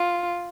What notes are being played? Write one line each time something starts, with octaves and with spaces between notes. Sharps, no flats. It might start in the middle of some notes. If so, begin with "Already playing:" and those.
Already playing: F4